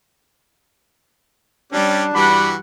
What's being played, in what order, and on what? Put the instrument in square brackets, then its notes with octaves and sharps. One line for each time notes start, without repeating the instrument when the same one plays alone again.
[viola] G3 [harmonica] C#4 G4 D5 [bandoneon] D4
[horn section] G2 D5 B5 [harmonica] E3 F#4 [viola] G3 F#5